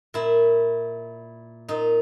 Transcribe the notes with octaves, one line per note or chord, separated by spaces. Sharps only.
A#2 E4
A#2 D#4